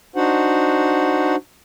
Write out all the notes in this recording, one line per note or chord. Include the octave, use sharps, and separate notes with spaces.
D4 D#4 F#4 C5 F#5